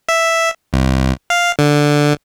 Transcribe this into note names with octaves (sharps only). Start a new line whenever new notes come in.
E5
C2
F5
D3